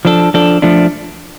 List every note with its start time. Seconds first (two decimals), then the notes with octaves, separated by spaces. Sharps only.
0.05 F3 D4 A4
0.34 F3 D4 A4
0.62 F3 A3 D4